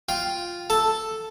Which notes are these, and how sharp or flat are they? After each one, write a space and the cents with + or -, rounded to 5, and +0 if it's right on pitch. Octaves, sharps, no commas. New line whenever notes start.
F4 +0 G5 +0
A4 +0 A5 +0